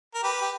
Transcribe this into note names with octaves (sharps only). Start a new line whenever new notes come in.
A#4
G4 B4
G4